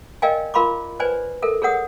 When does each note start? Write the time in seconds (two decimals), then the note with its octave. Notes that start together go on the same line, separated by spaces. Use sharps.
0.22 A#4 D5 D#5 F5 G5 G#5
0.54 F4 A#4 F5 B5 C6 D6
1.00 B4 C5 D5 G#5
1.42 A4 A#4 E5
1.62 G#4 A#4 C#5 F#5 D#6